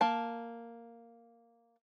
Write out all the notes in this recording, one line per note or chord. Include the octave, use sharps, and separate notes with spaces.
A#3 A5